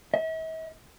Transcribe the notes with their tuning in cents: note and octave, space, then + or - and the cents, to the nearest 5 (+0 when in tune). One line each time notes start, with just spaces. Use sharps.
E5 -45